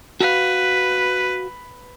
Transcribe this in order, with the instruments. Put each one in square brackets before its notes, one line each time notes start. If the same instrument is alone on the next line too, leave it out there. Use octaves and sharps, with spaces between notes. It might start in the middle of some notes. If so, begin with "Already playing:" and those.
[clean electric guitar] F#4 F5 [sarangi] B4